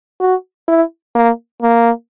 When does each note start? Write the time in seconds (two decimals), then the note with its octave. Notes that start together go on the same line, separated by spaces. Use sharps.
0.21 F#4
0.68 E4
1.15 A#3
1.62 A#3